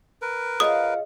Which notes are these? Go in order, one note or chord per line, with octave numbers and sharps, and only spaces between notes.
A#4 B4
F4 G#4 C#5 D#5 F5 F#5 D#6